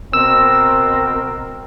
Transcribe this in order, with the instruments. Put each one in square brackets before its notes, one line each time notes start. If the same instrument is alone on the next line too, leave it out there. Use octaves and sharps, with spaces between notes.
[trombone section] B2 C4 A#4 [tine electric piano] E6